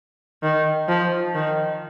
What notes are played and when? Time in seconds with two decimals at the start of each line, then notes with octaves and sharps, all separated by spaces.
0.43 D#3
0.89 F3
1.35 D#3